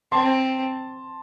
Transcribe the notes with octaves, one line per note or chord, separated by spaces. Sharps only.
C4 A5 C6